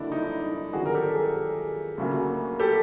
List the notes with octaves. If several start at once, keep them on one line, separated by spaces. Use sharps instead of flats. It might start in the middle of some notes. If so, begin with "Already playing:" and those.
Already playing: F#1 F#2 D3 D4 E4
D#4
D#4
G#1 F#2 D3 F3 F#4 G#4
A#4
G4 A4
G#4 A#4
D2 C#3 F#3 A#3
G4 A4